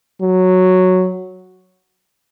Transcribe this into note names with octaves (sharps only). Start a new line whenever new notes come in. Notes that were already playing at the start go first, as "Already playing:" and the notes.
F#3